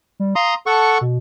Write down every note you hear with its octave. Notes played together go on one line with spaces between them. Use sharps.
G3
F5 A#5 C6 D#6
A4 F#5 A5 C#6
B2